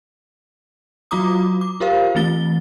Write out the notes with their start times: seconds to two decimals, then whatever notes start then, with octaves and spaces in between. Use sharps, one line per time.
1.11 F#3 F4 F#4 A#5 D6 D#6
1.61 D6
1.80 F4 G4 A#4 C5 F5
2.15 E3 A3 C4 F4 A6 G7